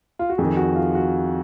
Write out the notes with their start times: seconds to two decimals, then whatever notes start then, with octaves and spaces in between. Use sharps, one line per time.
0.19 F4
0.29 F#4
0.38 F2 G#4
0.43 D#3
0.57 F#4
0.75 F4
0.95 F#4